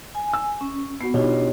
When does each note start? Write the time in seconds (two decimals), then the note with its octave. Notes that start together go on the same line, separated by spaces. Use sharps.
0.15 G#5
0.33 E6
0.61 C#4
1.01 B3 F#4 C7
1.14 B2 D4 D#4 F4 G4 C#5